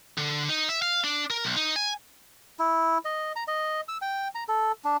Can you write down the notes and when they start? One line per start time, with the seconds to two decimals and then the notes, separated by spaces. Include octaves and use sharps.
0.18 D3
0.49 D#4
0.69 E5
0.82 F5
1.04 D4
1.30 A#4
1.45 B1
1.57 D#4
1.76 G#5
2.59 E4
3.05 D#5
3.36 A#5
3.48 D#5
3.88 E6
4.02 G5
4.35 A#5
4.48 A4
4.84 D4